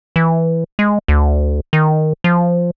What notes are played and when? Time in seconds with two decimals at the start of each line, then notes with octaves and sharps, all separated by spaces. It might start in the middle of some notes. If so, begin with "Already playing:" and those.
0.16 E3
0.79 G#3
1.08 D2
1.73 D#3
2.24 F3